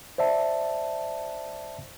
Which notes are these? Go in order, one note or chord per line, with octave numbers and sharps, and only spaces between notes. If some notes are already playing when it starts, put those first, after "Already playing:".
C5 D5 E5 A5